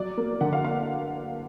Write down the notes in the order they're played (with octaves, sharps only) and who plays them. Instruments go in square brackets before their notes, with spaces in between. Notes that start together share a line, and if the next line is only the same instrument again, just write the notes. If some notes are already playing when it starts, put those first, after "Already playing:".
Already playing: [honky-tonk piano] F#3 D5
A#3
D3 F#5
F5
F5